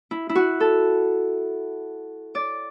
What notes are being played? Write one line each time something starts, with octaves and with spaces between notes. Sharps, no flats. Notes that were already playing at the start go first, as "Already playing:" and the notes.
E4
E4
F#4
A4
D5